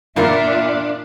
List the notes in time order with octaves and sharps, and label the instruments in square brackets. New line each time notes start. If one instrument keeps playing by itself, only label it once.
[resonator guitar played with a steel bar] E2 F4 A#4 [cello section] A#2 [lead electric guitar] D4 [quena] E5